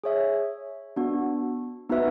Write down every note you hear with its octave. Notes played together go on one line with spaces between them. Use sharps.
G#4 C#5 E5
B3 D4 F#4
B3 D#4 F#4 B4 E5